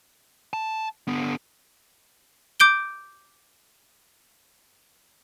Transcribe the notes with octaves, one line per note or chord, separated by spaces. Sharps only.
A5
D3 B3
D6 G6 D7 G7